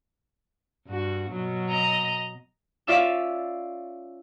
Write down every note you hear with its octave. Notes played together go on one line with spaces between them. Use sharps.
G2 F#4
B2 F#3
D#5 A#5
C#4 F4 D5 E5 E6 E7